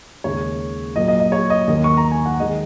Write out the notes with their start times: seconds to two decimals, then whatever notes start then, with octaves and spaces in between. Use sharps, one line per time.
0.24 D#2 C#3 G#3 C#5
0.96 A#2 F#3 A#3 D#5
1.08 D#5
1.20 D#5
1.32 C#5
1.50 D#5
1.67 D#2 D#3 A#3 D#5
1.84 C#6
1.97 A#5
2.12 G#5
2.26 F#5
2.40 D#3 G#3 D#5